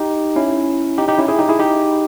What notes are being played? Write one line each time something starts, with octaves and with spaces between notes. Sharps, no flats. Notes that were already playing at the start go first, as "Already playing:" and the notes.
Already playing: D#4 G4
C#4 E4
D#4 G4
D#4 G4
C#4 E4
E4 G#4
D#4 G4
E4 G#4
D#4 G4